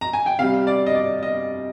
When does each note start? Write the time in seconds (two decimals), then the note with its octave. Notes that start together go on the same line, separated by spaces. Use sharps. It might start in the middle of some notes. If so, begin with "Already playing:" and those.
0.01 A#5
0.13 G#5
0.26 G5
0.39 C3 G3 F5
0.67 D5
0.86 D#5
0.95 D5
1.23 D#5